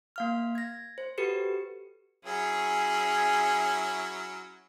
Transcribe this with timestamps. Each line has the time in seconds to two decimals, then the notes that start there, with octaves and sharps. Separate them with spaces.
0.16 A#3 F5 F6
0.55 G#6 A#6
0.98 C5
1.18 F#4 G4 A4 B4 C#7
2.25 F#3 C#4 E4 G#4